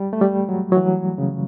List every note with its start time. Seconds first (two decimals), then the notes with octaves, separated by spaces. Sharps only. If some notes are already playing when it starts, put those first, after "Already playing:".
Already playing: G3
0.13 A3
0.21 G3
0.49 F#3
0.72 F#3
0.77 E3
1.18 C#3